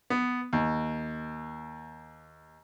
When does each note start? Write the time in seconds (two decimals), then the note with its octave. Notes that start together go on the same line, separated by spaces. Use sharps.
0.10 B3
0.53 D#2